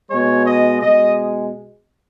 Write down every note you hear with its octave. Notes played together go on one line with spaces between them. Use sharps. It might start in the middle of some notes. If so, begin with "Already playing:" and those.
B2 G#3 C#5
D#5
B2 G#3 D#5